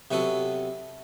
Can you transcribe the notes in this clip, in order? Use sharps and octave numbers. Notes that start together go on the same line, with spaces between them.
C3 F#3 B3 F#4 A4